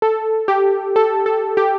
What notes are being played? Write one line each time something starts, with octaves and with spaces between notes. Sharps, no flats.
A4
G4
A4
A4
G4